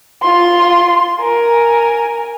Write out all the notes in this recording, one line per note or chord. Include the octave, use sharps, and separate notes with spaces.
F4 C6
A#4 G#5